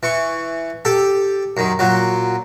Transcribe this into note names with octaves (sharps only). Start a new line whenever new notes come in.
E3 C#6
G4 A4
F#2 D#3
A#2 F#3